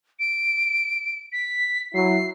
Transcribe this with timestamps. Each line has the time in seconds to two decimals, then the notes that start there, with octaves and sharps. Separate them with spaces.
0.19 D7
1.33 B6
1.94 F#3 E4 C7